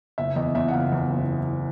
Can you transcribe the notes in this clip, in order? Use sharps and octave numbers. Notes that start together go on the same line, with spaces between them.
F#1 E5
E2 D#5
E2 E5
F#5
F#1 F5
E2
F#1